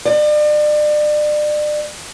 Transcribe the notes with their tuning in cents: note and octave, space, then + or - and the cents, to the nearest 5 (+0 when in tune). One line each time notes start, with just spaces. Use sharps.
D5 +35